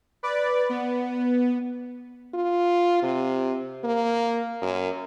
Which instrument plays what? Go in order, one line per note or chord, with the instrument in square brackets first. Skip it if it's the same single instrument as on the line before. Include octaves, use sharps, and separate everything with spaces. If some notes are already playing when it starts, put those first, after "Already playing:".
[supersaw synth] B4 D5
B3
[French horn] F4
C3
A#3
F#2